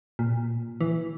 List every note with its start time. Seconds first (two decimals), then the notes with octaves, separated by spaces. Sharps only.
0.19 A#2
0.81 E3